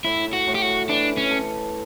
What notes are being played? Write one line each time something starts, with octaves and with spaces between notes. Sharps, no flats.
A2 E4
F#4
A2
G4
F#4
E3 D4
C#4
A4